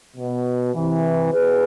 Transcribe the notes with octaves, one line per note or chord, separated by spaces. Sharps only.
B2
C3 E3
B2 G#4 B4